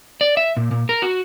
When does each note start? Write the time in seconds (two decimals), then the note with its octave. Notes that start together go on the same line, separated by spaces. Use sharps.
0.21 D5
0.37 E5
0.57 A#2
0.71 A#2
0.89 A#4
1.02 F#4